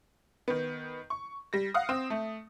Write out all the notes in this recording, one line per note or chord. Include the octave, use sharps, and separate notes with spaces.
D#3 B3
C#6
G3 A#6
F5 F#5 D#6
C4
A3